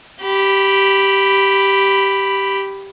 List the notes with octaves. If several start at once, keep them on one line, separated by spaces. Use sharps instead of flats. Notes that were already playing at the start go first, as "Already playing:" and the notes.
G4 B5